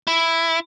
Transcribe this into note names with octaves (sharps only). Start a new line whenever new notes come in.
E4